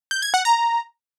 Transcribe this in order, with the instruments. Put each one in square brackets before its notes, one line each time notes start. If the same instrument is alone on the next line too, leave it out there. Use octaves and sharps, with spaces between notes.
[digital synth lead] G6
G#6
F#5
A#5